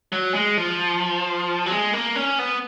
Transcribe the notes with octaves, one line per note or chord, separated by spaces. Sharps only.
F#3
G#3
F3
F#3
G#3
A#3
C#4
B3